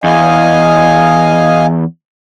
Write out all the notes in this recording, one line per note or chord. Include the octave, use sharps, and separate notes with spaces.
E2 D#5 F5 G#5